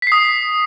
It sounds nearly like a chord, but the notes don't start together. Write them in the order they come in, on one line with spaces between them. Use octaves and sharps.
B6 C7 D#6